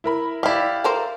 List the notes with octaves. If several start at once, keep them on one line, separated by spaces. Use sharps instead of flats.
E4 A#4 B5
E4 G4 D5 F5
A4 A#4 C5